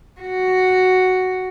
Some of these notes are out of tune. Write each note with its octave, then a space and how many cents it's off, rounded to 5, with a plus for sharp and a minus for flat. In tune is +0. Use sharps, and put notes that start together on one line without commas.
F#4 +5